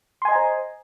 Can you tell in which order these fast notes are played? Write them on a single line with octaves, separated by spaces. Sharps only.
C6 G#5 D#5 A#5 C5